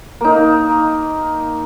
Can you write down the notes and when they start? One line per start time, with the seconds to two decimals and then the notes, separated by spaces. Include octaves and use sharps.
0.21 A#3 D#4